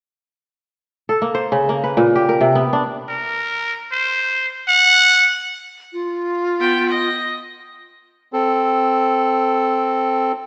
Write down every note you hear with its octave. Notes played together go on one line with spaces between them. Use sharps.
A4
A#3
C5
C#3
A#3
B4
A#2
G4
A#4
C3
B3
D4
A#4
C5
F#5
F4
B3 G5
D#5
C4 A4